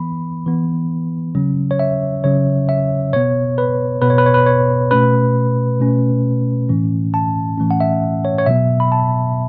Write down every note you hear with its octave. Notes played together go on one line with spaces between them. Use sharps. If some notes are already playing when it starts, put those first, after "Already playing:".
Already playing: E3 B3 B5
E3 B3
C#3 F#3 C#4
C#5
E5
C#3 F#3 C#4 C#5
E5
B2 B3 C#5
B4
B2 B3 B4
C#5
B4
C#5
B4
C#5
B2 A3 C#4 B4
B2 A3 C#4
A2 E3 A3 C#4
A5
A2 E3 A3 C#4
F#5
E5
C#5
C#5
B2 F#3 B3 E5
B5
A5